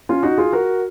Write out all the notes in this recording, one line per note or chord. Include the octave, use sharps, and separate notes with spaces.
C#4 F4
D#4 F#4
F4 G#4
F#4 A#4